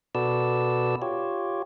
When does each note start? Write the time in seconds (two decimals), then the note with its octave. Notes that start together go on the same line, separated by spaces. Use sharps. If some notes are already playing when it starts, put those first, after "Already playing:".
0.15 B2 F#4 A4 B4 D5 E6
1.02 F4 G4 C#5